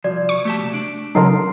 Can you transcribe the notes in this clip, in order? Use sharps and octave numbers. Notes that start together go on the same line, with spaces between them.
C2 F3 F#4 D5
C#6
A3 G4 A5
C3 A3
D4 D7
C#3 F#3 D#4 A4 A#4 C6 C7